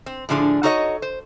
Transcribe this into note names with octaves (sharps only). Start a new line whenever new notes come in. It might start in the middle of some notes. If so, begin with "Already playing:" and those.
C4
A2 D3 F3 D4 G#4
D#4 F#4 A4 C#5 D#5
C5